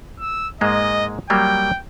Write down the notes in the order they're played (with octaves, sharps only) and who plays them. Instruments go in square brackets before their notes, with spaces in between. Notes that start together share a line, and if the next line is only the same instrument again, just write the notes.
[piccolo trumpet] E6
[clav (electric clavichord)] G#2 G#3 A#3 [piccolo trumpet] D#5
[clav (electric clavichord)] F#3 G3 A#3 [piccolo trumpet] G5